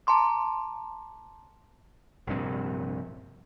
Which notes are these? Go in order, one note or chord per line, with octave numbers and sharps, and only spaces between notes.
A5 A#5 C6 D6
A#1 G2 C3